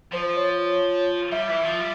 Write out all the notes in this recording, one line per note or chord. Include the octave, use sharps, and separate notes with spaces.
F3 C5
C#5
G3 E5
E3
F3
G3